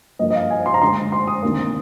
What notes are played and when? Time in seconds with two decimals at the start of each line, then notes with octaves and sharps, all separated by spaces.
0.19 G2 F3 A#3 D#5
0.30 D#5
0.35 F5
0.50 G#5
0.66 C6
0.74 A#5
0.81 D2 D3 G#3 C6
1.12 C6
1.27 D#6
1.43 D2 C3 D#3 A#3